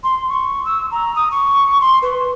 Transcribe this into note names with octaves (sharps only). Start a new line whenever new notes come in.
C6
C#6
E6
A#5
D#6
C#6
C6
B4